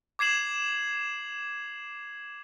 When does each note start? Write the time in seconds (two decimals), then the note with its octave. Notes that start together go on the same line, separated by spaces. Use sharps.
0.19 D6 G#6 C7 E7 F#7